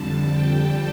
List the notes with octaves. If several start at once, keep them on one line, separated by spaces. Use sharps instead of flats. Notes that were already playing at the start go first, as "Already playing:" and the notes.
Already playing: F2 D3 G3 A5
G5